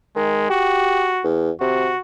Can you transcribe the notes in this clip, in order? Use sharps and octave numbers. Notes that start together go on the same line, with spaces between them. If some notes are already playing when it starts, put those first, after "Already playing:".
D#3 G#3
F#4 G4
E2
C3 F#4